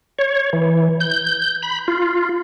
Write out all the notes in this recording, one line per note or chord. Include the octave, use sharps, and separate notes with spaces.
C#5
E3
G6
B5
F4